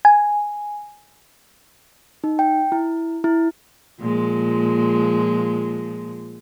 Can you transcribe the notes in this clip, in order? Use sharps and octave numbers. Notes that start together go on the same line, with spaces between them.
G#5
D#4
G5
E4
E4
A#2 F3 G#3